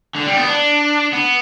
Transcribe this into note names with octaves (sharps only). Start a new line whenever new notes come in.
D3
G3
B3
D4
B3